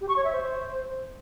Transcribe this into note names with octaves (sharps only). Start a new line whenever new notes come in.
G4
C#6
C#5
E5
C5